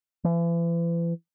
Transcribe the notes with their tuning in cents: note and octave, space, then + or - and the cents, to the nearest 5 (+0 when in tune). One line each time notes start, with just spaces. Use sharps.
E3 +40